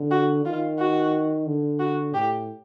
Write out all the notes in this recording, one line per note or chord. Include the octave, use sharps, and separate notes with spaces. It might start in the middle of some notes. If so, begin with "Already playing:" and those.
Already playing: D3
F#4
D#3 F4
F#4
D3
F#4
A2 G4